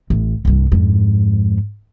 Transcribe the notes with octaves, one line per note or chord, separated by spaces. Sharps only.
A1
C2 G2
F2 G#2